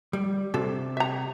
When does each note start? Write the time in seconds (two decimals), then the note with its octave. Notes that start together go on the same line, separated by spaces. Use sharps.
0.13 G3
0.54 C3 F#4 A4
0.97 E5 A#5